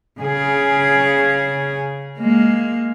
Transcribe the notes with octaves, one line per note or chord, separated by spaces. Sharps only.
C#3 G#4
G#3 A#3